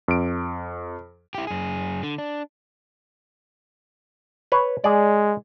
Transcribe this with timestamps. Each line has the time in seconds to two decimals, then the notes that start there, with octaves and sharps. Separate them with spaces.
0.08 F2 D7
1.35 E4 G4
1.47 F#2 G#4
2.03 D3
2.18 D4
4.52 B4 C#5
4.84 G#3 G#4 D5